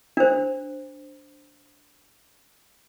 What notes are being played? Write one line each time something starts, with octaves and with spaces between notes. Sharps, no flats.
D4 C5